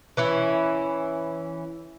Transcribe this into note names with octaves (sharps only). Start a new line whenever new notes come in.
E3 C#4 E4